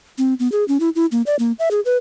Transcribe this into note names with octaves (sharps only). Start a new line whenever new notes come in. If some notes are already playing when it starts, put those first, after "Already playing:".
C4
B3
G#4
C#4
E4
E4
A#3
D5
A#3
E5
G#4
B4